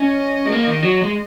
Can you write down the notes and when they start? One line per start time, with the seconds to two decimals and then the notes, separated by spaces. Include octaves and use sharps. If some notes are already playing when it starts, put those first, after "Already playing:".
Already playing: C#4 D#5
0.46 G#3
0.52 A#3
0.67 D#3
0.83 F#3
1.02 G#3